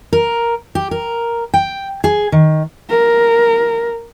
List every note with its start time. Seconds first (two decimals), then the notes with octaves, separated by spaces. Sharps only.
0.13 A#4
0.75 G4
0.91 A#4
1.54 G5
2.04 G#4
2.32 D#3
2.90 A#4